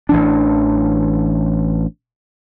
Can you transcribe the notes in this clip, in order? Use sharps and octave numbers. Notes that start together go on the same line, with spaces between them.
A1 E3 D4